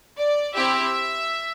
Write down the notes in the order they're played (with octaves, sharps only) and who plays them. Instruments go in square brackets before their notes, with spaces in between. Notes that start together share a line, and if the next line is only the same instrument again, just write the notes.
[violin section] D5
C4 E4 G4 E5